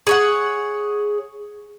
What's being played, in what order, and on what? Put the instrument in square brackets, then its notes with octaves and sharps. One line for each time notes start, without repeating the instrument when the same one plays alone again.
[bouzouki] G#4 C#5 F#5